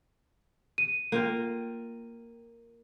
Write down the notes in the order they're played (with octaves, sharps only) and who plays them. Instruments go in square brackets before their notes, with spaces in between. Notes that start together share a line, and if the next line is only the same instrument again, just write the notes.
[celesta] D#7
[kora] A#3 F4 G5